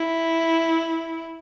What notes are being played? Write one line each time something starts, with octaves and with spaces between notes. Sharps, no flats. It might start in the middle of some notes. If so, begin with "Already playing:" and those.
Already playing: E4